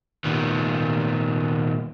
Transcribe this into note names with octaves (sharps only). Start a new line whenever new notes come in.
A#2 D#3 G3 B3